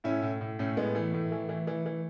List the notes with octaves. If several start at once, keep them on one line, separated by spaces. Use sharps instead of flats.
A2 C#4 E4
A2
A2
A2 A3 C#4
A2 G#3 B3
E3 A3
A2
E3
E3
E3
E3